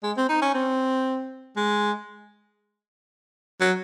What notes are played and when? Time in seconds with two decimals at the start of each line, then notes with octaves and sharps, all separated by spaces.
0.03 G#3
0.17 C4
0.29 D#4
0.42 C#4
0.54 C4
1.56 G#3
3.60 F#3